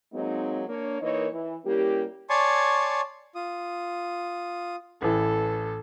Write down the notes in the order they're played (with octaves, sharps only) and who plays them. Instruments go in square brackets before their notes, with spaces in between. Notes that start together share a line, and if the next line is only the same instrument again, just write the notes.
[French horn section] F#3 G#3 A#3 C4 D#4
A#3 D4 C#5
E3 A#3 D#4 A#4 C#5 D#5
E3
G3 A#3 C#4 E4 G4
[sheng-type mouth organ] C#5 D5 G#5 A5 C6 C#6
F4 D#6
[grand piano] A1 E3 [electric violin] A4